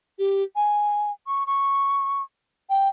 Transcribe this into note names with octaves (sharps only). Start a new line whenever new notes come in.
G4
G#5
C#6
C#6
G5